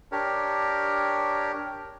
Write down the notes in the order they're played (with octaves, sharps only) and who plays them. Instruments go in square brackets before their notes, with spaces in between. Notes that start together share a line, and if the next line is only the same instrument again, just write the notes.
[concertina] D4 G4 A#4 C#5